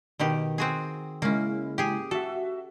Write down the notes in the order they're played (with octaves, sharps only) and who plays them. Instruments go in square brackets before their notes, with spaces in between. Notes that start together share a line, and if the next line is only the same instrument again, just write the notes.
[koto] B2 D#3 G4
C4 F#4 G#4
[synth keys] C#3 G#3 E4 [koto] A#3 C#4
[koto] G4 G#4
[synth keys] F#4 E5 [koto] A4